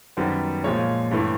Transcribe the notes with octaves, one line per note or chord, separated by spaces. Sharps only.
F#2 D#3 G3 B3 C5
A#2 F3 G#3 C#5
G2 E3 A3